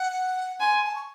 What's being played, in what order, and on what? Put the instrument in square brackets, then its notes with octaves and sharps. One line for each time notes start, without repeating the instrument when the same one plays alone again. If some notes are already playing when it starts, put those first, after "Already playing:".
Already playing: [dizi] F#5
[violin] G#5 [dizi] C6
[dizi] A5
C#6